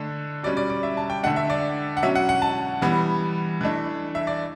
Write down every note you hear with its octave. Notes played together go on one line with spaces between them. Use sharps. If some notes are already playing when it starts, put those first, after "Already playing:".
Already playing: D3 A3 D4
B2 G3 C#4 D5
D5
D5
E5
A5
G5
D3 A3 D4 F#5
E5
D5
F#5
B2 F#3 C#4 E5
F#5
F#5
A5
E3 G3 B3
E3 A3 D4
E5
D5